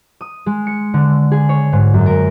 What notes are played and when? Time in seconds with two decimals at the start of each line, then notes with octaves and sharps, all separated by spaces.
0.21 D#6
0.46 G#3
0.67 C#7
0.94 D3
1.32 G#4
1.49 C#5
1.72 G#2
1.94 F#2
2.06 A#4